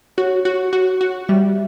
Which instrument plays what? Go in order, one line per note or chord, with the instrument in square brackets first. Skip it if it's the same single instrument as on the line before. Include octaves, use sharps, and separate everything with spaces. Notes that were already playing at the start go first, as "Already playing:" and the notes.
[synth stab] F#4 [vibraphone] C#5
[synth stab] F#4
F#4
F#4
[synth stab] G3 [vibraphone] E5